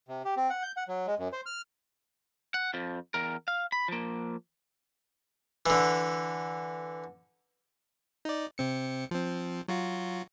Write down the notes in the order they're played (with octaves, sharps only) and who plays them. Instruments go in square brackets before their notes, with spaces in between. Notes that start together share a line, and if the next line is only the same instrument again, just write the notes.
[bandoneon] C3
G4
C4
F#5
G6
F#5
F#3
G#3
F#2
C5
F6
[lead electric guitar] F#5
F2 F3
E2 A#4
F5
B5
F3 A#3
[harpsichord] D3 E3
[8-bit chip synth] D#4 D5
C3 C4 C#7
F3 C4
F#3 F4 F#4